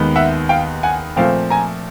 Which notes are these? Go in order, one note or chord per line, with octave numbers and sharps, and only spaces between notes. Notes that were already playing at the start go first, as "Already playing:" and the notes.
Already playing: D#2 D#3 G#3 B3
E5 F#5
F5 G5
F#5 G#5
A#2 F3 A3 C4 F5 G5
G#5 A#5